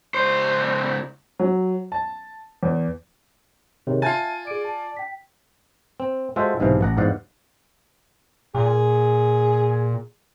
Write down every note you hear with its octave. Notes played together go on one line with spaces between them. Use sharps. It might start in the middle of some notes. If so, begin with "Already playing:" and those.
C#2 C5
F#3
A5
E2
C3 D#3 G#4 C#5
F4 E5 G#5 A5 A6
G#4 D5 D7
A5
G5 B6
C4
G#3 F4 F#4 A4 C5 E5
B1 G#2 C3 E3 F5
A1 F#5 A#5
E2 G#2 D5 F5 F#5
A#2 G#4